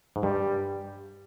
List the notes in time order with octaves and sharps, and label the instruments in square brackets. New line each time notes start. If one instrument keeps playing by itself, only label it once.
[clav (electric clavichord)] G#2
[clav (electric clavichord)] G2 [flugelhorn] G3